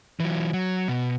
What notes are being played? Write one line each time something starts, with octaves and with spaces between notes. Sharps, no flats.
E3 F#3
F#3
B2